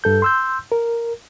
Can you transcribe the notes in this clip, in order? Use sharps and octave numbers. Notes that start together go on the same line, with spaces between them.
G2 A4 G6
C6 E6 G6
A#4